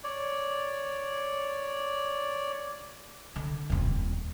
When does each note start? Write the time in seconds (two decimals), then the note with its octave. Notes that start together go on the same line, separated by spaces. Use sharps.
0.04 C#5 D5
3.36 D3
3.70 D#1 F2